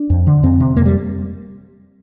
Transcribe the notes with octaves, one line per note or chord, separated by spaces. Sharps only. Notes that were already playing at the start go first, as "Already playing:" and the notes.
Already playing: D4
F2
D3
F2 C4
C3
F2 A#3
G3